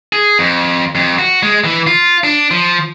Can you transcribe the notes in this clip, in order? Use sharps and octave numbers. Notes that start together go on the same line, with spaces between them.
G#4
F2
F2
F#4
G#3
E3
F4
D4
F3